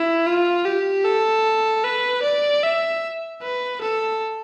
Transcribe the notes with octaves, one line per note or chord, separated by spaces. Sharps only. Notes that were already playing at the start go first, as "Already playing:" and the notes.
Already playing: E4
F4
G4
A4
B4
D5
E5
B4
A4